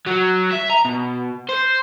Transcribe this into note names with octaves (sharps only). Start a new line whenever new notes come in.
F#3
E5
A#5
B2
C5